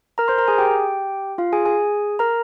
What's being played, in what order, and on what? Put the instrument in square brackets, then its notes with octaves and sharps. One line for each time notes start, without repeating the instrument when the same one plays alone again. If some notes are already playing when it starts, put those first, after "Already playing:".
[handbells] A#4 A#5
C5 C6
A#4 A#5
G#4 G#5
G4 G5
F4 F5
G#4 G#5
G#4 G#5
A#4 A#5